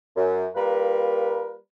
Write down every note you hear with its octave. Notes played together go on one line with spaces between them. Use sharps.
F#2
G3 A#3 F4 A#4 B4